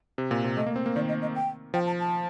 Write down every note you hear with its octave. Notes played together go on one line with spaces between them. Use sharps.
C3
A#2
C3
A3 D#5
A#3
C4
A#3
D#3 D5
D#5
D#5
G5
F3 G5
A5
A5